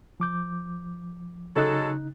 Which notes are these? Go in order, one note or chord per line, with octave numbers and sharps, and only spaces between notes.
F3 D6 G6
C#3 F#3 G#3 D#4 A4 F#6